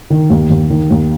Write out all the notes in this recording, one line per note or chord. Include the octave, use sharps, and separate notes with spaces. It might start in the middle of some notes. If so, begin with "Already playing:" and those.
D#3
D#2
D#2
D#3
D#2